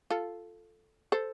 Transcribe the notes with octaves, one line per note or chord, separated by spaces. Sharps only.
F4 A4
A4 C5